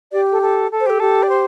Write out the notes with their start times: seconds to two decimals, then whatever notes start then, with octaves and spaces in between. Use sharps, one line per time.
0.12 G4 D5
0.32 A4
0.42 A4
0.71 A4
0.80 C5
0.86 G4 A4
1.00 G4 A4
1.23 D5
1.29 C5